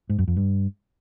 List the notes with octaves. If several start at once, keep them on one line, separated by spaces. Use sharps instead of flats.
G#2
F#2
F2
G2